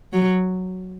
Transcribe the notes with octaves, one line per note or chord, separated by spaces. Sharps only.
F#3